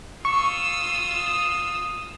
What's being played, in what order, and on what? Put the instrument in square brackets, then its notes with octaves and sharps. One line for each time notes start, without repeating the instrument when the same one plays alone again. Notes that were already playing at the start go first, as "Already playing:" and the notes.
[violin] F4 E6 [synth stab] C#6 [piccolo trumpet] D#6